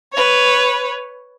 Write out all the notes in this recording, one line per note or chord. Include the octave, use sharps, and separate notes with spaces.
B4 C#5